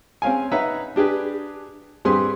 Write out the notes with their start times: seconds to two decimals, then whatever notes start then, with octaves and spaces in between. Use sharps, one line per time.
0.22 C4 C#4 F5 G#5
0.52 D#4 B4 C#5 E5 F#5 A#5
0.96 D4 G4 G#4 B4
2.05 G2 G3 C4 G#4 B4 C6